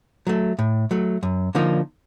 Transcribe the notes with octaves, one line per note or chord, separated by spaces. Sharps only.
F#3 A3
A2
F#3 A3
F#2
D3 F3 A#3 D#4